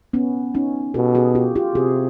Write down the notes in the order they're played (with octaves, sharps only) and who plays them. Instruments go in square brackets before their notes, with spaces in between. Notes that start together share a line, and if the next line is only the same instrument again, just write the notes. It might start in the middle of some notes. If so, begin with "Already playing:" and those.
[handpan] B3 C#4
C#4 D#4
[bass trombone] B2 [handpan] G4 A4
[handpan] F#4 G#4
F4 G4
F4 G4
[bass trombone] C3 [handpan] F#4 G#4